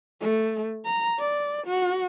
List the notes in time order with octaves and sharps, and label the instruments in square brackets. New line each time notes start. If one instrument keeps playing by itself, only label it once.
[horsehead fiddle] A3
A#5
D5
F#4